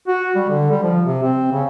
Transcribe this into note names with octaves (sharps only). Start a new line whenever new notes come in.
F#4
G3
D3
G3
F3
C3
C4
C#3